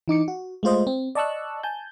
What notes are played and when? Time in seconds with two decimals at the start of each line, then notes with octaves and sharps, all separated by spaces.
0.08 E3 D#4 D6 C#7
0.28 F#4
0.63 G#3 A3 F4 C5 D#5
0.87 C4
1.15 D5 D#5 A5 C#6 E6 F#6
1.63 G#5 A5 G6